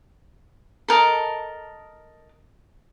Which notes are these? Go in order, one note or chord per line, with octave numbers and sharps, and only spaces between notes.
A4 A#4 D#5 A5